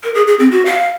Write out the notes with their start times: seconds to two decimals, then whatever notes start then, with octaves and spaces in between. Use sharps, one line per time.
0.03 A#4
0.15 G#4
0.27 G#4
0.39 C4
0.52 F#4
0.65 F5